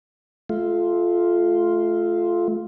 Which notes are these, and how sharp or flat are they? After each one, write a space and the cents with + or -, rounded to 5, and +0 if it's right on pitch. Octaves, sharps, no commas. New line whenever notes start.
A3 -25 F4 +0